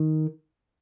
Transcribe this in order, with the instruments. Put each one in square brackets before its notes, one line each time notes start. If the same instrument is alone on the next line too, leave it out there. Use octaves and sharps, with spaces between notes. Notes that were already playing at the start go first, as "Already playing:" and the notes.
Already playing: [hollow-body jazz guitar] D#3